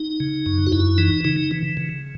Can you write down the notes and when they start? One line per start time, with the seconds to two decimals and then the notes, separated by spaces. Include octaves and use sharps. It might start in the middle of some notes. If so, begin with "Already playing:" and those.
Already playing: D#4
0.20 C#3
0.46 F#2
0.67 F#4
0.72 F#2 E4
0.98 E3 D#4
1.24 C#3 D#4
1.51 E3
1.77 C#3